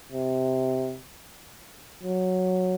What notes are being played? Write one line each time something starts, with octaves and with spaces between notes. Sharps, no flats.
C3
F#3